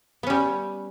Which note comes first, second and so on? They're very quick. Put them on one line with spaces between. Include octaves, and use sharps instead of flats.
B3 C#4 G3